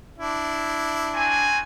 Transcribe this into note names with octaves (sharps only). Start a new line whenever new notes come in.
D4 E4
C4 F#4 G#5